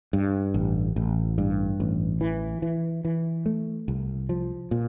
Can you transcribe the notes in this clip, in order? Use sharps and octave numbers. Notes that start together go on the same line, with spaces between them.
G2
A1
A1
G2
A1
E3
E3
E3
A3
C2
F3
A#2